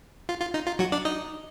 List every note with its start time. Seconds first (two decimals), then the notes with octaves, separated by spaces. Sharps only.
0.29 F4
0.41 F4
0.54 D#4
0.67 F4
0.79 F#3 F#4
0.92 D4 D5
1.05 D#4 D#5